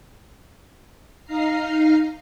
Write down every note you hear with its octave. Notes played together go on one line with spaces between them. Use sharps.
D#4 F5 A#5 C7